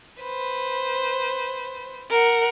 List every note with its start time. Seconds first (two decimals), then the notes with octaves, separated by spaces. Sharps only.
0.22 B4 C5
2.11 A#4 F#5